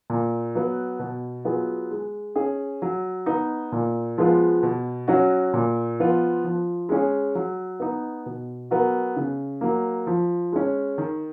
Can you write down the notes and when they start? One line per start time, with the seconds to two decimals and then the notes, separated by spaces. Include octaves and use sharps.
0.10 A#2
0.55 F#3 B3
0.99 B2
1.45 F#3 B3 F4 G#4
1.91 G#3
2.36 C#4 G#4
2.82 F#3
3.26 B3 D#4
3.72 A#2
4.18 F3 G#3 B3 F4
4.63 B2
5.08 F#3 C#4 F#4
5.54 A#2
5.99 F3 B3 F4
6.44 F3
6.89 G#3 C#4 G#4
7.35 F#3
7.80 B3 D#4
8.26 B2
8.71 F#3 B3 F#4 A#4
9.16 C#3
9.61 F#3 A#3
10.07 F3
10.52 G#3 C#4
10.98 D#3